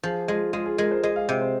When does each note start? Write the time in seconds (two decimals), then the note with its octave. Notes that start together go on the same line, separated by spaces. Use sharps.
0.03 F3 G#4
0.28 G#3 F4
0.53 G#3 F4
0.66 G#4
0.78 G#3 A#4
0.91 C5
1.03 G#3 D#5
1.16 F5
1.28 C3 D#5
1.41 C5